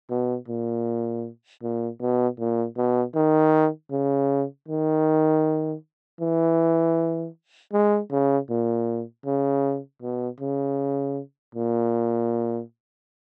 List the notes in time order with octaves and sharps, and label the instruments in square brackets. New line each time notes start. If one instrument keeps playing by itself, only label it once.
[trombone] B2
A#2
A#2
B2
A#2
B2
D#3
C#3
D#3
E3
G#3
C#3
A#2
C#3
B2
C#3
A#2